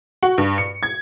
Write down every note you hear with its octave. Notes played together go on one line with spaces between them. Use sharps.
F#4
G2
C#7
G#6